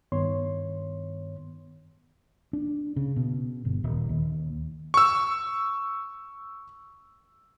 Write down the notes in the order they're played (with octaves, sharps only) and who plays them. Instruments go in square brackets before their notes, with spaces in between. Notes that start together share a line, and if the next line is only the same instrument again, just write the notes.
[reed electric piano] G2 D#3 B3 C#5 C6
[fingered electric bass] D4
C#3
B2
G1
D#1
D#2
[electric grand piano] C#6 E6